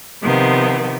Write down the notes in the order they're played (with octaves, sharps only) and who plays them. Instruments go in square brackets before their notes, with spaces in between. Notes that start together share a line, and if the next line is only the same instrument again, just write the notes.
[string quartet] C3 D#3 F3 B3